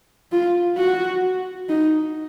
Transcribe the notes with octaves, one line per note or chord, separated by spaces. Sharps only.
F4
F#4
D#4